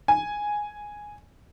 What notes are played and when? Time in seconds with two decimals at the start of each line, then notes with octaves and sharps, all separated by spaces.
0.08 G#5